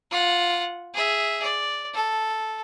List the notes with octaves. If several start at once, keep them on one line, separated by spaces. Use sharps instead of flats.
F4 F#5
G#4 E5
D5
A4